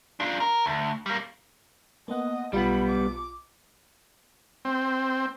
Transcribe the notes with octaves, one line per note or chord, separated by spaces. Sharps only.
D4 F4
A#4
D2
G3 A#3
A#3 B3 D#5 F#5
B1 G3 B3 F4 B5 C#7
D6
C4